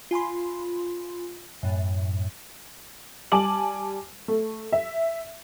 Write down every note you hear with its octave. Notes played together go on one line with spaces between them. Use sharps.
F4 G#5 B5 C6
F#2 A2
G3 G#5 A5 D6 F#7
A3
E5